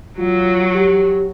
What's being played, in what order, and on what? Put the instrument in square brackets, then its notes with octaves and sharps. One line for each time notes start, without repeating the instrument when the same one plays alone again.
[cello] F#3 [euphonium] F4
[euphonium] G4